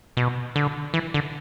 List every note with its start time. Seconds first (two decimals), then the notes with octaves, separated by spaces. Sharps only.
0.17 B2
0.56 D3
0.94 E3
1.14 D3